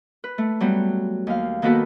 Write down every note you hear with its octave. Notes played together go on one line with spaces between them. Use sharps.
B4
A3
F#3 G3 B3
D#2 F5
D#3 A#3 B3 F#4 A4 B4